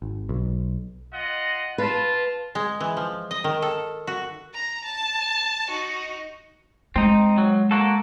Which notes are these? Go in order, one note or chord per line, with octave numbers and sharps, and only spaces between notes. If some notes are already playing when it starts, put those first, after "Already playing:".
G#1
B1
F4 D#5 F#5
F4 B4 A5
G#3
E3
F3
D#5
D#3
A4
F#4
A#5
A5
D#4 F#4
G#3 C4 D#4
F#3
A#3 F#4 A4